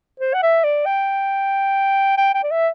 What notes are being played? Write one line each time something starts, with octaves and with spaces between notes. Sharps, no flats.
C5
F#5
E5
D5
G5
G5
G5
D5
E5